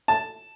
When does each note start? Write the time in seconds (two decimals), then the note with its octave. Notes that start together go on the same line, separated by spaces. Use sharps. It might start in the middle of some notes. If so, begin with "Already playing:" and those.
0.08 A5